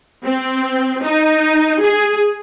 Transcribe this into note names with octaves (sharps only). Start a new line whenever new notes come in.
C4
D#4
G#4